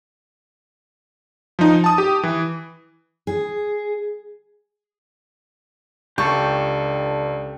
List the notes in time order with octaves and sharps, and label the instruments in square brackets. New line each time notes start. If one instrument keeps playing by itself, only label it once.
[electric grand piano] F3 D#4
A5 D#6
G4
E3
[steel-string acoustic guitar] G#4
[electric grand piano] C#2 [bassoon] D4 [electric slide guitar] G4 A4 [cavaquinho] C#6